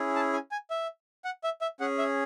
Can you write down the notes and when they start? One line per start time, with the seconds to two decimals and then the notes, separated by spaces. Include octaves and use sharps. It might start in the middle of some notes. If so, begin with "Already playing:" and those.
Already playing: C#4 E4 G#4
0.15 A5
0.33 G#5
0.52 G#5
0.70 E5
1.25 F#5
1.44 E5
1.61 E5
1.80 C#4 G#4 F#5
1.98 E5